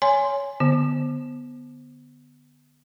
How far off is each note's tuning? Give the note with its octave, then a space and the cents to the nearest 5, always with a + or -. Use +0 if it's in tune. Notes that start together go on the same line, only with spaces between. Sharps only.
C#5 +15 G#5 +0 C6 +0
D3 +0 B3 +0